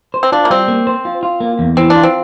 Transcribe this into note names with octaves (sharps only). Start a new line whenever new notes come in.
C5
C4
D4 F4
A#3
G3 C4
A#3
C5
F4
F4
A#3
E2
E3 C4
D4
F4
C4